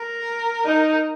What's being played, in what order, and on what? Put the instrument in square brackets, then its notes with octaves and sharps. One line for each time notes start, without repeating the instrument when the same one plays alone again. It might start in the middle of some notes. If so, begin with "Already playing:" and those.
Already playing: [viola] A#4
[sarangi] D#4